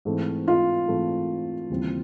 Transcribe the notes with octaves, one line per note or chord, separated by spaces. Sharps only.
G#2 E3 A3 C4
F4
G#2 E3 A3 C4
D#2 C#3 E3 G3 C4